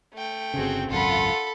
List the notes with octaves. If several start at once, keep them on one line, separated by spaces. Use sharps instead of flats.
A3 G5
G1 C#3 C4 F#4 G#4
G#1 C#2 F#2 F4 A4 F#5 B5